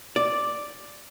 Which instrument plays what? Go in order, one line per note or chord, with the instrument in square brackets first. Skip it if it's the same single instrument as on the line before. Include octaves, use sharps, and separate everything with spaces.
[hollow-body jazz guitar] D5